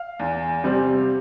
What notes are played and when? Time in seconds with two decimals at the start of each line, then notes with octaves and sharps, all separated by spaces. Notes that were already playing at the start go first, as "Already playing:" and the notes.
Already playing: F5
0.19 E2
0.64 C3 G3 C4